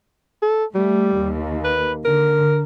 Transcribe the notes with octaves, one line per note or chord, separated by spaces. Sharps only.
A4
G3 A3
D#2
B4
D3 A#4